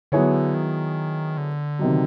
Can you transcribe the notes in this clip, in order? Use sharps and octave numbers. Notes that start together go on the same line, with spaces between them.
D3 F#3 B3 E4 G#4 C#5
D#3
D3
C3 D#3 F#3